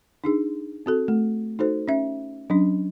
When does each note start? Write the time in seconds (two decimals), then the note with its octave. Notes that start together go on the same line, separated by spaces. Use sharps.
0.24 D4 D#4 G#4
0.86 C4 F#4 A4
1.08 A3
1.59 D#4 F#4 A4 C5
1.88 C#4 E5
2.50 F#3 C#4 D4